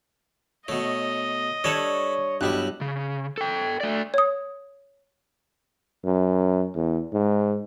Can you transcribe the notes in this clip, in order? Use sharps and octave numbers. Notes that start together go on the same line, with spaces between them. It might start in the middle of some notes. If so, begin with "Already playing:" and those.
B2 A3 C#5 D#5
G3 D4 A4 B4 C#5 E5
B1 G2 G3 E4 G4 D#5 F#6
C#3
A4 G5
A3 D5
C#5 D#6
F#2
E2
G#2